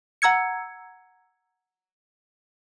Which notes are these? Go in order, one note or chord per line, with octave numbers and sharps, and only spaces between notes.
F#5 A#5 E6 G#6 C#7